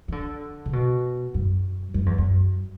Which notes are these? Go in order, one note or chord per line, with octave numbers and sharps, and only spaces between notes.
E3
D3
C#3
B2
F#2
F#2
E2
F#2